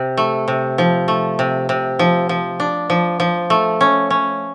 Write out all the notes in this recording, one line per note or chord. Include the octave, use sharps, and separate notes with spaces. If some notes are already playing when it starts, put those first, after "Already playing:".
Already playing: C3
A3
C3
F3
A3
C3
C3
F3
F3
D4
F3
F3
A3
C#4
C#4